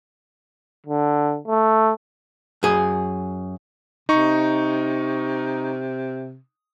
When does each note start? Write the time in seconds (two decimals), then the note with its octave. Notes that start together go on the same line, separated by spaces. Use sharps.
0.87 D3
1.48 A3
2.63 F#2 G#4
4.09 C3 D#4 C#6